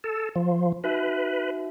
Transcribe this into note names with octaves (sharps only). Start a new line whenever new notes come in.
A4
F3
D#4 F#4 B4 E5